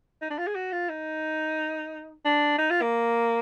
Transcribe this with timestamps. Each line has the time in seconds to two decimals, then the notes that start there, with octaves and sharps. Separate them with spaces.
0.22 D#4
0.30 D4
0.38 F4
0.47 G#4
0.55 F#4
0.72 F4
0.89 D#4
2.25 D4
2.58 D#4
2.71 F4
2.81 A#3